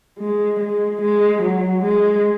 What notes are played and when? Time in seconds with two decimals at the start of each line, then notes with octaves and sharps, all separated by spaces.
0.19 G#3
0.60 G#3
1.01 G#3
1.43 F#3
1.84 G#3